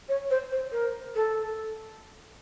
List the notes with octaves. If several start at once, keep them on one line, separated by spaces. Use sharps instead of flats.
C#5
C5
C5
A#4
A4